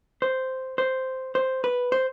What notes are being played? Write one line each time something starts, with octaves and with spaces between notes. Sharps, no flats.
C5
C5
C5
B4
C5